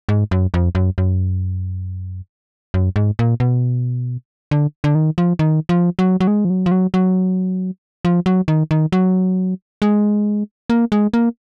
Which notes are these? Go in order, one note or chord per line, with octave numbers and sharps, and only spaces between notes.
G#2
F#2
F2
F#2
F#2
F#2
G#2
A#2
B2
D3
D3
D#3
F3
D#3
F3
F#3
F#3
G#3
F3
F#3
F3
F#3
F#3
F3
F#3
D#3
D#3
F#3
G#3
A#3
G#3
A#3